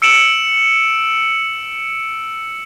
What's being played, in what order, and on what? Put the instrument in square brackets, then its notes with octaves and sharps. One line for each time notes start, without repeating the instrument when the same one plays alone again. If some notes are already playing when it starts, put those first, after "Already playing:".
[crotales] E6 C#7 D7 E7 F#7